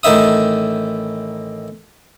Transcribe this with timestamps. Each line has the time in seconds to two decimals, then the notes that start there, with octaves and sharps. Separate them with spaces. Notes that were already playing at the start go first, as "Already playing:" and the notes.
0.03 A1 D#3 D#4 E5 D#6